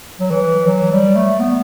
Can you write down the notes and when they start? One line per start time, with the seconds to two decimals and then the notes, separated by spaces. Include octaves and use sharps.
0.20 F#3
0.31 E3
0.67 F#3
0.91 G3
1.16 A3
1.40 B3